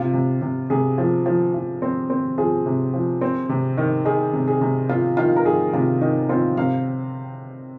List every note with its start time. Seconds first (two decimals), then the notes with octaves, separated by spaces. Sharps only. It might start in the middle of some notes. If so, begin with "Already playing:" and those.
Already playing: C3 F4
0.13 C3
0.41 C3
0.70 C3 G#4
0.98 F3
1.26 F3
1.54 F3
1.82 C4
2.10 C4
2.38 F3 G#4
2.66 C3
2.94 F3
3.21 C4
3.49 C3
3.77 D#3
4.05 D#3 G#4
4.33 C3
4.48 G#4
4.61 C3
4.89 C4 F4
5.17 D#3 F4
5.36 A#4
5.45 D#3 G#4
5.73 C3 F4
6.01 D#3 D#4
6.29 C4 F4
6.57 C3 F5